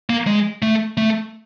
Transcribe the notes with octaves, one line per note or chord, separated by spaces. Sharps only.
A#3
G#3
A3
A3